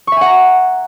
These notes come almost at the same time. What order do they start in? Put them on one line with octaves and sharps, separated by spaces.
C#6 E5 G#5 F#5 A#5